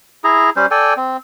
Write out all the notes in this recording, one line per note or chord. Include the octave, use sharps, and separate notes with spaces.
E4 G#4 A#5
G3 C#4 C5
A4 D5 G5 G#5
C4